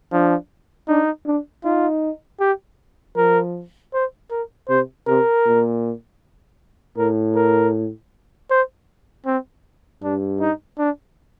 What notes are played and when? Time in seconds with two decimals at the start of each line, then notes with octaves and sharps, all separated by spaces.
0.12 F3 D4
0.88 D4 D#4
1.26 D4
1.64 D#4 F4
2.40 G4
3.17 F3 A#4
3.93 C5
4.31 A#4
4.69 C3 C5
5.07 C3 A#4
5.46 A#2
6.97 A2 A#4
7.35 A#4
8.50 C5
9.26 C4
10.03 G2 D4
10.40 D#4
10.78 D4